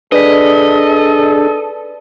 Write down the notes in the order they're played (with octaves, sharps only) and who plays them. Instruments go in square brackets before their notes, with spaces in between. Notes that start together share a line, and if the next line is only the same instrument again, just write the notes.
[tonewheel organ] D4 G#4 [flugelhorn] A4 [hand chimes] B4 D5 B6 [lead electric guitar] D#5